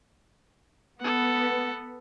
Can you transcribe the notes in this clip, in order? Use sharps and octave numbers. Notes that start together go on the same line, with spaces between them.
B3 A4 F#5